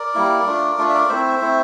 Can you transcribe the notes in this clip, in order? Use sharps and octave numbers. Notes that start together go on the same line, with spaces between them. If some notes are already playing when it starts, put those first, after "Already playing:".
Already playing: A#4 D5
G3 A#3 E4
A3 D4 F4
A3 D4 F4
E5
A#4 D5
A3 C4 E4 C5 E5
A3 C4 E4